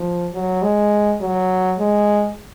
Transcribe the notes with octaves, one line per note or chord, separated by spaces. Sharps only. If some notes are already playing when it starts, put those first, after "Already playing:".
Already playing: F3
F#3
G#3
F#3
G#3